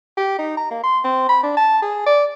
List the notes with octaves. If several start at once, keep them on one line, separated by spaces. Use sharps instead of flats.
G4
D#4
A#5
A#3
C6
C4
B5
D4
A5
G#4
D5